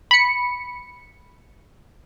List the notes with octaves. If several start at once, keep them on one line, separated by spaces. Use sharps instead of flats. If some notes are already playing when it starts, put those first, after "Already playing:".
B5 C#7